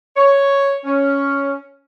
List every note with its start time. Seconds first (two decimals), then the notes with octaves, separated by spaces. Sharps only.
0.16 C#5
0.84 C#4